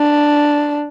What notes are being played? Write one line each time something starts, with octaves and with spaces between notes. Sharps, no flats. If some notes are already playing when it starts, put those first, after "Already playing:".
Already playing: D4